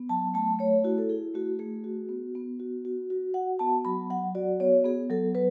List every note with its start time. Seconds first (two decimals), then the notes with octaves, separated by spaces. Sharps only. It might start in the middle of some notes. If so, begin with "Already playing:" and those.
Already playing: B3
0.09 F#3 A5
0.34 A3 A5
0.59 A3 C#5
0.84 E4 F#4
0.98 A4
1.09 E4 G#4
1.34 A3 F#4
1.59 A3 G#4
1.84 F#4
2.09 B3
2.35 B3
2.60 F#4
2.85 F#4
3.10 F#4
3.34 F#4 F#5
3.59 B3 A5
3.85 F#3 B5
4.10 F#3 F#5
4.35 F#4 D5
4.60 B3 C#5
4.84 B3 G#4
5.10 F#3 A4
5.35 F#3 B4